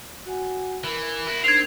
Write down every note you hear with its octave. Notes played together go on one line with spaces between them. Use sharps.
F#4 F#5 G#5
E3 A#4
E4 F#4
C4 D4 D#4 A#4 G#6 C7 F7